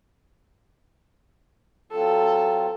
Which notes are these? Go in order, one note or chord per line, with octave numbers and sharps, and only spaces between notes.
F#3 C4 F4 A4